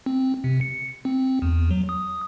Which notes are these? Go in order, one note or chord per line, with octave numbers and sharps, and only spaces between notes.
C4
C3
C#7
C4
E2
F#3
D#6